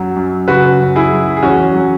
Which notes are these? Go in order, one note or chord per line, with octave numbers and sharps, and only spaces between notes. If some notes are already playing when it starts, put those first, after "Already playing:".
Already playing: F#2 F#3
F#2
C#3 F#4 B4
F#2
E4 G#4
F#3
G#4
E2 C#4 F#4
F#3